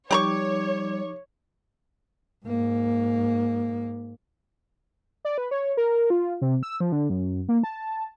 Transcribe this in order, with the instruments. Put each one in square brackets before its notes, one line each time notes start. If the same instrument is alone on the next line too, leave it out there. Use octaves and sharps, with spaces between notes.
[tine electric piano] F3 D#4 D6 [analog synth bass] G3 [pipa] G4 A#5 C#6 [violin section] C#5
[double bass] G#2 A#3
[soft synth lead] D5
B4
C#5
A#4
F4
C3
E6
F3
D3
F#2
A#3
A5